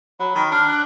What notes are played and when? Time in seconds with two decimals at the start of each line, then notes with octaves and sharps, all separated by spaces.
0.20 F#3 B5
0.35 D#3
0.52 D4 F6
0.68 F#6